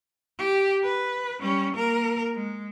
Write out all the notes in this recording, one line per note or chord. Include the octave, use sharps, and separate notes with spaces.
G4
B4
G3 C#4
A#3 A#4
G#3